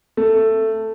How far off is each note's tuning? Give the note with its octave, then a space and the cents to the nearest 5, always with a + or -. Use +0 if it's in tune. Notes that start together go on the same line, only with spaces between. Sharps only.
A3 +10